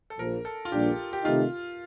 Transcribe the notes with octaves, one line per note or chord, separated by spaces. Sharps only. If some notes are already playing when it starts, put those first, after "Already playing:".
A4
A#1 A#2 F3 A#4
A4
F4
A#1 A#2 G3 D4 G4
G4
C3 D#3 A3 D#4 F4 G4